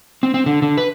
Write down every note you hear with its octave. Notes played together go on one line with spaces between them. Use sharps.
C4
C4
D3
D3
B4